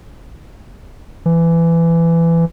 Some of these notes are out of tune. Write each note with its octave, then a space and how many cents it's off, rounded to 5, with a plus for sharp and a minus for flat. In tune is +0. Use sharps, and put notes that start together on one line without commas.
E3 +20